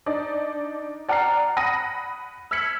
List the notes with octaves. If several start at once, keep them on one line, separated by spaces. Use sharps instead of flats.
D4 D#4 D5
D5 F#5 G5 A#5 F6 C7
F#5 B5 D#6 A#6 D#7
E6 F6 G#6 B6 C#7 F#7